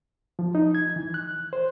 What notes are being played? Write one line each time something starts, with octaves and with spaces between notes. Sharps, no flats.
F3
D#4
G#6
E3
F#6
C5